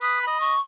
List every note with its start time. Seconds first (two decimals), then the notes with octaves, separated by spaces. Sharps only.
0.02 B4 D#6
0.21 B5
0.27 D#5
0.40 C#6